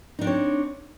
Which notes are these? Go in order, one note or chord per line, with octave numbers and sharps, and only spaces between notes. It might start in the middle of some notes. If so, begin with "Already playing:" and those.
C4 D4 D#4 C#5